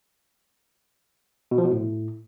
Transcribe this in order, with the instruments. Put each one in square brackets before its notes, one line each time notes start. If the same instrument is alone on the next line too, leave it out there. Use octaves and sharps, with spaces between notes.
[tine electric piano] B2
F3
B2
A2